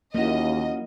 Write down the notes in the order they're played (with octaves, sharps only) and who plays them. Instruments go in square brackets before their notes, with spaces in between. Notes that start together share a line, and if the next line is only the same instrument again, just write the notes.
[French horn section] D#2 [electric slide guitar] F3 C#4 F#4 [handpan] A#3 E4 [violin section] D#5